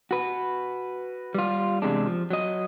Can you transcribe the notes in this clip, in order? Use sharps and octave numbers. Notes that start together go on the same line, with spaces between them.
F#4 B4
G3 F4
E2 C3 G#3 D4
F3
F#3 D#5